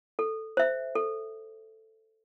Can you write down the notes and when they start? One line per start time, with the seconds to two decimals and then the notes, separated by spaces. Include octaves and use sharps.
0.19 A4
0.57 C5 E5
0.95 A4